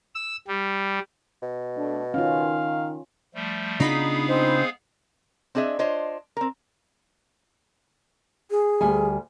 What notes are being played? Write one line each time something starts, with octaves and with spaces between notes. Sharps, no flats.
E6
G3
B2
A3 D4
D#3 C#4 F4 F5
F3 G3 A3
C#3 B3 D4 D#4 F4 G#4 F5 B5
G#3 C4 C5
C4 D4 G#4 D#5 E5
D4 F4 C5 C#5 D#5
C4 A#4
G#4
D2 G3 G#5